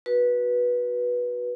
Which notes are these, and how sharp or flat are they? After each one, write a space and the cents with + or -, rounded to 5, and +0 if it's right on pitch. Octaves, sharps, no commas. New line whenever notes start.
F#4 -5 B4 -15